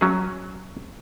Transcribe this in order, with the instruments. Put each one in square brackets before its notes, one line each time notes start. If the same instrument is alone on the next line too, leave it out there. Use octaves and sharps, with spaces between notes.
[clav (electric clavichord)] F#3 C#4 G#4